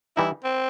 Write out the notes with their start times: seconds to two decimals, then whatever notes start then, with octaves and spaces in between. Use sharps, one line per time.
0.17 E3 G3 D#4 E4
0.44 C4